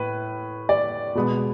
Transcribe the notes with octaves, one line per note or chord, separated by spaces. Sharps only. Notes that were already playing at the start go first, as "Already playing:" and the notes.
Already playing: A2 B4
D5
B2 G#3 B3